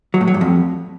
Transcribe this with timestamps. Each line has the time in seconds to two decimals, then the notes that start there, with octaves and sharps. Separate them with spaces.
0.14 F#3
0.21 A2
0.28 F#3
0.34 G2
0.41 F2